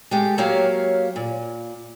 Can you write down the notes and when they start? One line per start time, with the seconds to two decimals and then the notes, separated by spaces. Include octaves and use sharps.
0.11 G#3 G4 A4
0.38 F#3 A#3 G4 C#5 F5
1.16 A#2